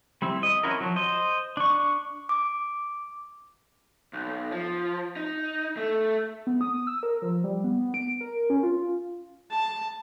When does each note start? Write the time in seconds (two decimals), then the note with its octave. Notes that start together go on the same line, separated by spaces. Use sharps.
0.22 G3 C4 E4
0.43 D#5
0.63 C4 C#4 E4 F#4 A#4
0.80 F3 F#3
0.96 C5 D#5
1.57 D4 C#6
2.29 D6
4.13 B1
4.52 F3
5.16 D#4
5.77 A3
6.47 B3
6.61 D#6
6.87 E6
7.03 A#4
7.22 F3
7.44 G3
7.64 B3
7.94 D7
8.21 A#4
8.50 C#4
8.63 F4
9.51 A5